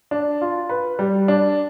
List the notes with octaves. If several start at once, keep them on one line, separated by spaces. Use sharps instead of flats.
D4
F4
B4
G3
D4